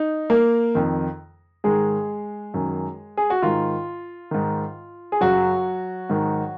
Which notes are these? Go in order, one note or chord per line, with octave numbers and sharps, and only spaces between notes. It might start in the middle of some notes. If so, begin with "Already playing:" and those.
Already playing: D#4
A#3 A#4
F2 D#3
G#2 D#3 G#3 G#4
F#2 D#3
G#4
F#4
G#2 D#3 F4
G#2 D#3
G#4
F#2 C#3 F#3 F#4
G#2 D#3